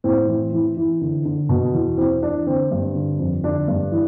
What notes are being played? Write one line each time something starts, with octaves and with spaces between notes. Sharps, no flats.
A2 C4
E3
E3
E3
D3
D3
B2
E2
E3 C4
E3 D4
D3 C4
G2
D3
F2
D3 D4
G2
E3